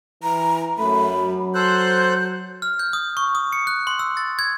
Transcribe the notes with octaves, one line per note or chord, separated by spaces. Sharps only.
E3 A#5
F#2 A3 B5
F#3
A4 C5 F#6 G6
F6
G6
D#6
C#6
D#6
C#7
F#6
C6
E6
A6
G#6